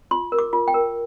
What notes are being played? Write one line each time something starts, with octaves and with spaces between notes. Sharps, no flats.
F4 C6
A#4
D6
F4
G5
A#4